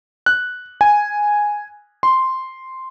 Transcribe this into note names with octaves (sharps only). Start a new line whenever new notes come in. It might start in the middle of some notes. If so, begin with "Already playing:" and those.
F#6
G#5
C6